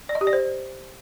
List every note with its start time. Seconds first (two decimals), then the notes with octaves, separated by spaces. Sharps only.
0.09 D5
0.15 D#5
0.21 G4
0.27 D5
0.33 C5